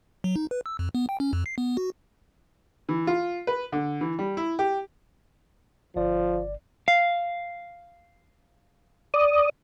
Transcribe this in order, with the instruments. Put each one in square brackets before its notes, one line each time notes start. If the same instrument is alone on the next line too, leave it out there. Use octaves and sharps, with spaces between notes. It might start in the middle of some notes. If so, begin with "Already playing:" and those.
[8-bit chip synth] F#3
D#4
B4
E6
F2
B3
G5
C#4
F2
C7
B3
F#4
[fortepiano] E3
F4
B4
D3
E3
G3
E4
G4
[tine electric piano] G1 D5 [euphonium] F3
[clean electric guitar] F5
[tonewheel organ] D5 D#6